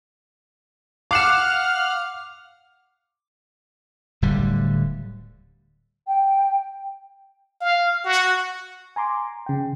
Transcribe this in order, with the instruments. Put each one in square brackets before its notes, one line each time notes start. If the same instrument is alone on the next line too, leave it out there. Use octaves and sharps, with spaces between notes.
[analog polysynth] F5 F#5 F6 [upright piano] D6 E7
[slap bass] D1 D3 G3
[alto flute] G5
[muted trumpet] F5
F#4
[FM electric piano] G#5 A#5 C6 D6
C#3 G5